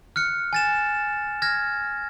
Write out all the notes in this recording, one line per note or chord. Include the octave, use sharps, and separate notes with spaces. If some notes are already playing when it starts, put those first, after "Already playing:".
F6 F#6 C#7
G#5 A6 E7
F6 G#6 A#6